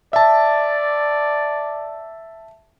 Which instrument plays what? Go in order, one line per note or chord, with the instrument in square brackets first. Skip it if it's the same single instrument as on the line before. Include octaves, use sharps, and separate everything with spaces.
[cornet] D5 [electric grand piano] E5 A5